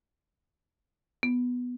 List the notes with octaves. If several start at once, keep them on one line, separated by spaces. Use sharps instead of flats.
B3